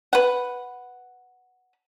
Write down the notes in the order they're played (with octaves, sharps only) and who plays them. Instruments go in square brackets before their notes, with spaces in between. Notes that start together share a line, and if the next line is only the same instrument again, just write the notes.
[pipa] B4 F#5